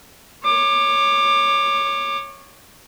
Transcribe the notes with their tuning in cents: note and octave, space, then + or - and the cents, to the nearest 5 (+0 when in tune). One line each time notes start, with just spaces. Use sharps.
C#5 +0 D6 +25